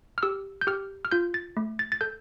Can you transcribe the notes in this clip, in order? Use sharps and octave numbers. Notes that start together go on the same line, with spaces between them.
F6
G4 E6
G6
G4 F6
F6
F4 G6
A6
A3
A6
A6
A4 G6